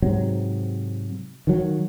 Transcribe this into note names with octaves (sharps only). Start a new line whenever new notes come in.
G#2 C3 F#3
D#3 F#3